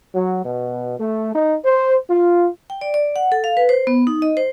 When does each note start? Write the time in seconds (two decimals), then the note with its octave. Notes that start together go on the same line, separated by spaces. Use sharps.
0.15 F#3
0.45 B2
0.99 A3
1.34 D#4
1.64 C5
2.09 F4
2.70 G5
2.81 D5
2.94 D5
3.16 F#5
3.32 A4
3.44 F5
3.57 B4
3.69 C5
3.87 B3
4.07 D#4
4.22 D#5
4.37 C5